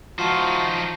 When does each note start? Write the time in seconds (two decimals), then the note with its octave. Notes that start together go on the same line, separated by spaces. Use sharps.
0.19 F3 D#4 F4 F#4 A5 C7